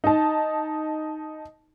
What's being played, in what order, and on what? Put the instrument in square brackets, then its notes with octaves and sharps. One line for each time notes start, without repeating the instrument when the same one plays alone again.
[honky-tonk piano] D#4 A5